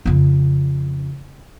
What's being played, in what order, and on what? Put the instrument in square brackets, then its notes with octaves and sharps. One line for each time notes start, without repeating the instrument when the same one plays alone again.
[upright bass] F2 C#3